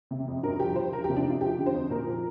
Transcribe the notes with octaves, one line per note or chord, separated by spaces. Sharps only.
C3
F2
G2 A#4
F3 G4
F3 C5
F3 A#4
G4
C3
D4
F2 F4
F3 G4
D3
C5
F2
A#2 A#4
F3